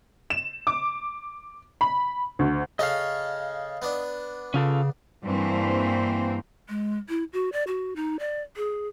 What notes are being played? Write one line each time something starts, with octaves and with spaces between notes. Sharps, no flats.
E7
D6
B5
D2
C#3 C#4 A4 D#5 F5
B3 D4
C#3 C#4 F4 A4
G2 E3 A#3 C4 C5
G#3
E4
F#4
D5
F#4
D#4
D5
G#4